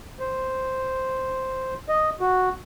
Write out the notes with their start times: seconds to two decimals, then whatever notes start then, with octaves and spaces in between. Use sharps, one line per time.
0.20 C5
1.89 D#5
2.21 F#4